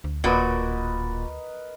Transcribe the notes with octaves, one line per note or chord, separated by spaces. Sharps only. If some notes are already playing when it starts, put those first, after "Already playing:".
D2
D1 A#2 F#4 A#4 B4 D#5